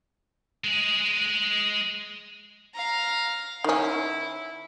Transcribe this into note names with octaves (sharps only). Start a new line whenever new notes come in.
G#3 G#4
F5 A#5
D#3 C#4 E4